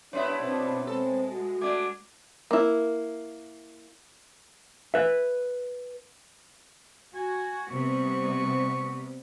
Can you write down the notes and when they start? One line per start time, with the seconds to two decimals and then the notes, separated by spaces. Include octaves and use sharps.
0.13 F#2 B3 D4 E4 C#5 E5 C6
0.42 B2 C4 D4
0.87 G#3 C4 A4
1.30 F#4
1.61 A3 D4 F#5 D6 G#6
2.51 A#3 E4
4.94 B4 E5
7.15 F#4 G#5
7.71 C3 G3 B3 C#6